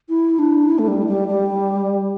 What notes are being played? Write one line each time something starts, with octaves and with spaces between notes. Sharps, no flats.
E4
D4
E4
A3
G3
G3
G3